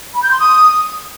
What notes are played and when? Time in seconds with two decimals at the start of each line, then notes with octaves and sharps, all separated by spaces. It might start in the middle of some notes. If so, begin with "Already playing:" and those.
0.13 B5
0.22 G6
0.31 C6
0.39 D#6